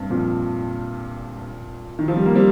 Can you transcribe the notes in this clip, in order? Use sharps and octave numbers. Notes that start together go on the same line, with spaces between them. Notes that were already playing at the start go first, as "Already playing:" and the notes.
Already playing: G2 C3
F2 A#2
D#3
F3
G3
A#3
G3 C4